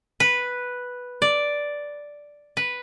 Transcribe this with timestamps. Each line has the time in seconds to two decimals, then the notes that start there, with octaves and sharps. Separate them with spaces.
0.20 B4
1.22 D5
2.57 B4